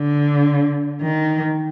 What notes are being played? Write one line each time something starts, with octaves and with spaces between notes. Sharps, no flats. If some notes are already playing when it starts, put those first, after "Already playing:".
Already playing: D3
D#3